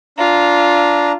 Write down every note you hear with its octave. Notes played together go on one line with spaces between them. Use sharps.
D4 F4 A#5